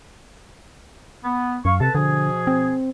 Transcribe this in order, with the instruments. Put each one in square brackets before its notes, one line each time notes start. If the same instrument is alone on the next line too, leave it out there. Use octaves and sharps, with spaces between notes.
[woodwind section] B3
[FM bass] F#2 [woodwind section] F5 C#6
[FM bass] C3 [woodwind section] A4 B4 A5
[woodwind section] B2 F3 G#4 [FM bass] D3
[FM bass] C4